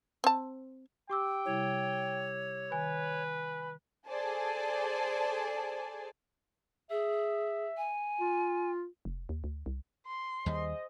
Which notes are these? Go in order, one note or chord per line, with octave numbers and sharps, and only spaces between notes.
C4 A5
G4 G5 D6 E6
C3 G3 E4 C#5
D#3 B4 G#5
G#4 A4 C5 D5 G#5 A5
G#4 E5
G#5
F4
F1
D#2
D2
C2
C6
D#2 D#3 G3 G#4 C5 D#5